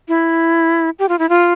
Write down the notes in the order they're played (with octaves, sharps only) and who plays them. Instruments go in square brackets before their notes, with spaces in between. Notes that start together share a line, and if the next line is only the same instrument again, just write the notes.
[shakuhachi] E4
G4
F4
E4
F4